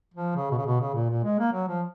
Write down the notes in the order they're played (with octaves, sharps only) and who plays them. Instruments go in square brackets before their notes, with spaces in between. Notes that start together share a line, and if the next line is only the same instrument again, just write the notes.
[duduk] F3
C#3
B2
C#3
B2
C#3
A#2
A#2
G#3
A#3
F#3
F3